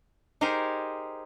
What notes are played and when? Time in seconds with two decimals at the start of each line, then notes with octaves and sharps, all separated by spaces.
0.41 D#4 G4 G#4 A#4 C5